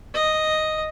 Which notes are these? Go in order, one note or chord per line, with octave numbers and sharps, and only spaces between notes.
D#5